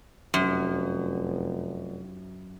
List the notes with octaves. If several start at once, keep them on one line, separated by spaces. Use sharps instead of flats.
F1 F#2